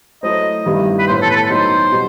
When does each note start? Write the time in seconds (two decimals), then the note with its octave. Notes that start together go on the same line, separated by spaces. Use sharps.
0.23 F#3 A3 E4 A4 C5 D#5
0.66 G2 D#3 G3 B3 E4
0.99 B4
1.07 A2 E3 B3 C5
1.22 A4
1.30 B4
1.35 A4
1.50 F#3 B3 D#4 C5
1.92 B2 G3 C4 D#4